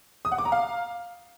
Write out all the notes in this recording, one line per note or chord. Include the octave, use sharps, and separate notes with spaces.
D#6
F#5
D6
A#5
F5